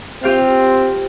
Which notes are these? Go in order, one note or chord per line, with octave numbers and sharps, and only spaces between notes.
C4 F4 G4 F5